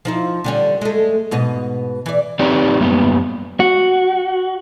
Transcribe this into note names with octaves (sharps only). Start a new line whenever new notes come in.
F3 D#4 E4
D3 G3 C#4
G#3 A3
G#2 B2 D#5
E3 D5
C4 D#4 G4 B4 C#5 D5
F#2 G3 A#3 B3
F#4